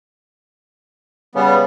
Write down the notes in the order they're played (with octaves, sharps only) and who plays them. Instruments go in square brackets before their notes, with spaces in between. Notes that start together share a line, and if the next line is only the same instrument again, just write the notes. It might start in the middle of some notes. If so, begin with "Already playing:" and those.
[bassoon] C#3 [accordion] G3 B3